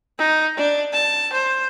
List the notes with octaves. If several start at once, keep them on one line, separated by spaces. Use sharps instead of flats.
D#4
D4
A5
C5